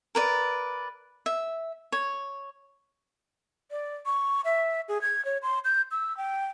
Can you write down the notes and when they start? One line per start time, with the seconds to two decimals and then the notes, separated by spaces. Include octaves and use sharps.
0.15 A#4 B4 D5
1.26 E5
1.92 C#5
3.71 D5
4.06 C#6
4.45 E5
4.89 G#4
5.02 G#6
5.25 C#5
5.42 C6
5.65 G6
5.91 E6
6.17 G5